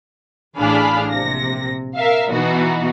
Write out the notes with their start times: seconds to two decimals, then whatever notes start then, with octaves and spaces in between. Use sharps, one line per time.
0.58 A1 D4 G#4 F5 B5
1.11 A#1 C3 A#6
1.96 A#4 E5 F5
2.31 B2 E3 B3 D#4 F#4